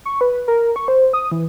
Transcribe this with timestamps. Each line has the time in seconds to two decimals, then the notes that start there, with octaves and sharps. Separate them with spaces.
0.05 C#6
0.21 B4
0.48 A#4
0.76 C#6
0.88 C5
1.13 D#6
1.31 E3